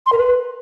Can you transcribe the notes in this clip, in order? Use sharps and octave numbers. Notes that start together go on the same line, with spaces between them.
C6
A#4
B4